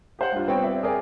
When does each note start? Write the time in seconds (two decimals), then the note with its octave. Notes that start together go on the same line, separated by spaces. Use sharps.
0.19 G4 C5 F#5
0.32 G3 D4 F4
0.46 G3 B3 C4 C#5 G5
0.63 D5 E5
0.83 G#4 A#4 D5 G#5